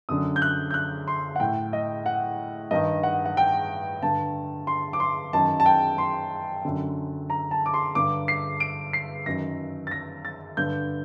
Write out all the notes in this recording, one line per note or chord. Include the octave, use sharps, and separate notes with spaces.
F#2 D3 D#6
G6
F#6
G6
F#6
C6
F#5
A2 G5
D#5
F#5
G2 D#3 D#5
F#5
F#5
G5
G2 D3 A5
C6
D6
C6
F#2 D#3 A5
A5
G5
C6
F#2 D3
A#5
A5
D6
C6
G2 D3 D6
C7
D7
C7
F#2 D#3 A#6
A6
A#6
A6
G2 D3 G6